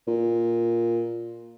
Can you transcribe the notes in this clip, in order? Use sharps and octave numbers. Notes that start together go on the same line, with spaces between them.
A#2